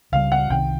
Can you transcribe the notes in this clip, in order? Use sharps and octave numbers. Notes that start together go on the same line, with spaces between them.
C#2 C#3 E3 G3 F5
F#5
C2 C3 D#3 G5